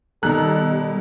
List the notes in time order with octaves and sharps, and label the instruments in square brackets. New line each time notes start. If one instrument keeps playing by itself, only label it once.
[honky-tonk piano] B2 A#5 [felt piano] D#3 F#6 [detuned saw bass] G3 [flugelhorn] A4